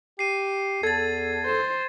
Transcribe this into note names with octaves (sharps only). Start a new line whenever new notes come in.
G4 C7 D#7
E2 A4 G#6 A6
C5